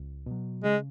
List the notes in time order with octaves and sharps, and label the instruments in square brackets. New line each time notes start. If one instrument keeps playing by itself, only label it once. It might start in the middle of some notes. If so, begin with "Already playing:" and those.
Already playing: [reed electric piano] C#2
B2 F#3
[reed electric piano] C#3 [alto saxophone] G#3